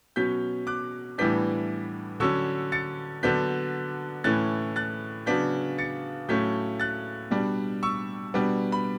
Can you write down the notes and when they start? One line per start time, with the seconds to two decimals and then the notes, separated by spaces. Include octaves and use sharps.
0.16 B2 F#3 C#4 G6 B6
0.67 D6 F#6
1.18 A2 E3 G3 B3 D4 G6 B6
2.20 D3 F#3 C#4 C#6 E6
2.72 A6 C#7
3.23 D3 F#3 B3 D4 G6 B6
4.24 A2 E3 A3 C#4 F#6 A6
4.76 F#6 A6
5.26 C#3 F#3 B3 D4 G6 B6
5.78 A6 C#7
6.28 A2 F#3 A3 C#4 G6 B6
6.80 F#6 A6
7.31 B2 G3 D4
7.83 C#6 E6
8.34 B2 G3 B3 D4
8.72 B5